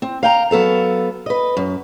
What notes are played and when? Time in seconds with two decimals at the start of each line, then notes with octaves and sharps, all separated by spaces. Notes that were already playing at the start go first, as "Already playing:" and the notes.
0.02 C4
0.23 F5 G5 A#5
0.51 F#3 B3 A4 F5
1.26 B4 D#5
1.57 F#2